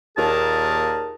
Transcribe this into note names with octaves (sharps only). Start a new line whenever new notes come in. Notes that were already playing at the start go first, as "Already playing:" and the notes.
D#2 A#2 G#4 A#4 A5